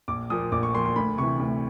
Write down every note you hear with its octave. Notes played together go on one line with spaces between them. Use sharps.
A#1 D6
A#2 F3 D#6
A#1 D6
C#6
A#2 F3 C6
C6
D2 B5
C3 E3 C#6
D2